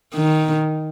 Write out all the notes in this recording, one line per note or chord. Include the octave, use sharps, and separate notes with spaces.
D#3